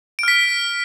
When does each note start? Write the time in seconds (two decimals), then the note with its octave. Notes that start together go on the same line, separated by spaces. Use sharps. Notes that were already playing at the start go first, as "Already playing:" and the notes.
0.19 D7
0.23 F6
0.28 B6